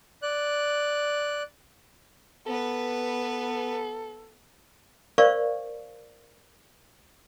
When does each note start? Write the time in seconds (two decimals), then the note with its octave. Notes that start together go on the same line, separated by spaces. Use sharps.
0.22 D5 F#6
2.47 B3 A4 B4
5.18 A#4 C5 D5 F5 C#6